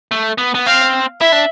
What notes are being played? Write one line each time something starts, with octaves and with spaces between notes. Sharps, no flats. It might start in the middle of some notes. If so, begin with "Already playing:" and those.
A3
B3
B3
C4 F5
E4 E5
D4